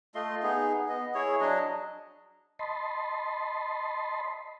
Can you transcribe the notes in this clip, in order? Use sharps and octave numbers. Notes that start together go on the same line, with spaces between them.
A3 F4 D#5 C6
B3 D#4 G#4
B3 D#5
E4 G#4 C#5
F#3 D4 D#5
D#5 A5 B5 C6